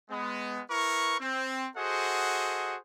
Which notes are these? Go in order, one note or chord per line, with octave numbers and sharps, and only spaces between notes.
G#3 B3
E4 A#4 B4 C#6
C4
F#4 G#4 A4 C5 D#5 F#5